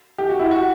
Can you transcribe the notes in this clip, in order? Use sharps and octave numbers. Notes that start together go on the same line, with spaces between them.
G4
F#4
E4
F#4